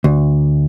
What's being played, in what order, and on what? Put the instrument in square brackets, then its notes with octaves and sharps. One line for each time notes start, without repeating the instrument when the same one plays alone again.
[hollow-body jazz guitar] D2